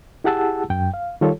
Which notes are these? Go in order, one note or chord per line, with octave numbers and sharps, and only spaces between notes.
E4 G4 G#4 F#5 A5 E6
F#2 G5
F5
D#3 G3 F4 A4 C#5